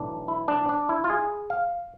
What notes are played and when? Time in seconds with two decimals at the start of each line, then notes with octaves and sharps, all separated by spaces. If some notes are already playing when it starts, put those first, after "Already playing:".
Already playing: B1 A2 E3 D4
0.28 E4
0.48 D4
0.69 D4
0.89 E4
1.04 F4
1.10 G#4
1.50 F5